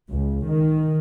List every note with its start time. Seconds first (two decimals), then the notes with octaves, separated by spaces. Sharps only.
0.11 C#2
0.48 D#3